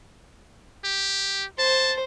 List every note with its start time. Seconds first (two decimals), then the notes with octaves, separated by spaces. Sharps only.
0.85 G4
1.59 C5 A5